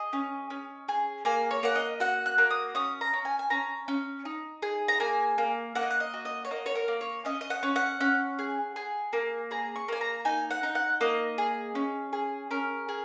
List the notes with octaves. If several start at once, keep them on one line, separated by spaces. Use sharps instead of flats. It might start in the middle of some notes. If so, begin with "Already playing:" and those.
Already playing: G#4 D#5
C#4
C#4
G#4
A#3 G#5
C#5
A#3 F#5
D#5
F#4 F#5
F#6
A#3
D#6
C#4 D#6
A#5
C#4
G#5
G#5
C#4 A#5
C#4
D#4
G#4
A#5
A#3 G#5
A#3
A#3 F#5
D#5
F#5
D#5
F#4
D#5
C#5
A#3 D#5
C#5
A#4
A#3
C#5
C#4 D#5
D#5
F#5
C#4
F#5
C#4
G#4
G#4
A#3
G#4 A#5
C#6
A#3 G#5
A#5
D#4 G#5
F#5
D#4
F#5
A#3 D#5
G#4
C#4
G#4
C#4 A#4
G#4